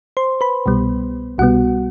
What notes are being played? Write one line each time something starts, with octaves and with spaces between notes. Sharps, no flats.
C5 C6
B4 B5
C2 B2 G3 B3
C2 B2 G3 B3 F#4 F#5